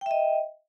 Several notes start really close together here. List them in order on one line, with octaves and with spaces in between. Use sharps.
G5 E5 D#5